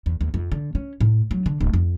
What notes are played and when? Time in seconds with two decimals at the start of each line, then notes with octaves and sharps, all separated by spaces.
0.06 E2
0.21 D#2
0.34 F2
0.52 D3
0.75 C#4
1.01 A2
1.31 F#3
1.46 D3
1.61 D1
1.73 F2